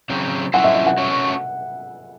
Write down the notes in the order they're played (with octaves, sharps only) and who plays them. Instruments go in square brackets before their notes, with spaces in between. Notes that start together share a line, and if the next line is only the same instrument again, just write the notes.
[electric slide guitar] C#3 F#3 C4
[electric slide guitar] F#3 C#4 E4 A4 C5 [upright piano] F#5
[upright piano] E5
E5
F#5
[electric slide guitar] A3 C#4 F#4